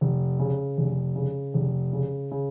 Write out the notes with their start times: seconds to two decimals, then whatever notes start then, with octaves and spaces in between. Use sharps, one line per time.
0.01 F1
0.40 C#3
0.78 F1
1.16 C#3
1.54 F1
1.93 C#3
2.32 C#3